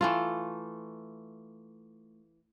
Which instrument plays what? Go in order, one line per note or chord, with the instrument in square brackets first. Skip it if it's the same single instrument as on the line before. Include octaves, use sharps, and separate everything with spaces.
[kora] E3 A3 F4